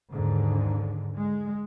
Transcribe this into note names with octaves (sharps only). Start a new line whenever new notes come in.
D#2 G#2 D3
G#3